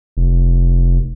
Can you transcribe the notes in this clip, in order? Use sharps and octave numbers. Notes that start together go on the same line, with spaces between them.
F1